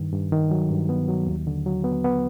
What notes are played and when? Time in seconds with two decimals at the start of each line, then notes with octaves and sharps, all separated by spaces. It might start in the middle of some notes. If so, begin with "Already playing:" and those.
Already playing: G2 D#3
0.13 G2
0.32 D#3
0.51 F#3
0.70 G2
0.89 B3
1.08 F#3
1.27 D#2
1.47 D3
1.66 F#3
1.84 B3
2.04 B3